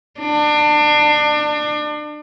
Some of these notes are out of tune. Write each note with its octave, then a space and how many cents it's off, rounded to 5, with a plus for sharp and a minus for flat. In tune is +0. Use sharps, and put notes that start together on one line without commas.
D4 +30